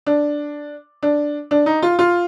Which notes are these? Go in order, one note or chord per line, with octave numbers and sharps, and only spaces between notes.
D4
D4
D4
D#4
F4
F4